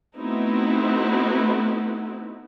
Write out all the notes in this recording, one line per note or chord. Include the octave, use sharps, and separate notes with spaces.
A3 B3 C4 D#4 E4 F#4